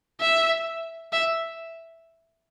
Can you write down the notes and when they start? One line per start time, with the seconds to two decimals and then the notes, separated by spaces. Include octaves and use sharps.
0.20 E5
1.13 E5